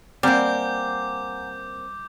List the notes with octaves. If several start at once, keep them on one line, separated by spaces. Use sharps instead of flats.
G3 A#3 C4 F#5 G#5 A#5 D6 G6